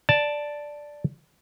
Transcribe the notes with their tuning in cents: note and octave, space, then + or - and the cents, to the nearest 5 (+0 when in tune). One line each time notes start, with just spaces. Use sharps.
D5 +0 A5 +0